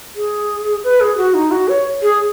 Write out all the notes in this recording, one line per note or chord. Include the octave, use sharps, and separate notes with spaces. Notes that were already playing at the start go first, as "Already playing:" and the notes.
G#4
B4
G#4
F#4
D#4
F#4
C#5
G#4